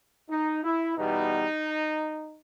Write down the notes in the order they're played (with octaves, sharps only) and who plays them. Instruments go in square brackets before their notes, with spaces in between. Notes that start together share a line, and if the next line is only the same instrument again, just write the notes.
[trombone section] D#4
E4
E2 B2 G3 B3 D#4